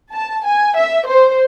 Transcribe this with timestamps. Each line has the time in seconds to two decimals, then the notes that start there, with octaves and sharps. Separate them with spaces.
0.12 A5
0.45 G#5
0.76 E5
1.07 C5